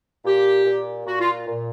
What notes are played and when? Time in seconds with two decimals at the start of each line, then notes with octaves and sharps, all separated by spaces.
0.25 A#2 G4
0.65 A#2
1.06 A#2 F#4
1.20 F4
1.47 A#2